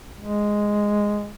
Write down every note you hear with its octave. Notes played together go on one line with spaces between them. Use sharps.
G#3